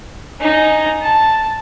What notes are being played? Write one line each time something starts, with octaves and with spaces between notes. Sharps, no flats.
D#4 G#5
A5